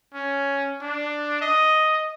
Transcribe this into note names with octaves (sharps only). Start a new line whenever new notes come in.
C#4
D4
D#5